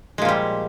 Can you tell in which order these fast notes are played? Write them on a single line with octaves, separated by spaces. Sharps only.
G#3 A#2 F3 G3